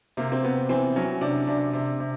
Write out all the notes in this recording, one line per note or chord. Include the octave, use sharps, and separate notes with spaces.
C3 A#3
C4
C3 B3
E3 C4
F#3 C#4
C3 D4
C3 D4
C3
C3